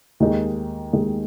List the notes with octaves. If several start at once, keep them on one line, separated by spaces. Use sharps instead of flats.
D#2 D#3 G#3 D#4 G#4
D#2 D#3 G#3 D#4 G#4